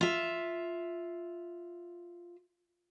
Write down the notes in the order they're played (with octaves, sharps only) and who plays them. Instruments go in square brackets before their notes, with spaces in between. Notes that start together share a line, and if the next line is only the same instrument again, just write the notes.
[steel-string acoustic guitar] F4 E5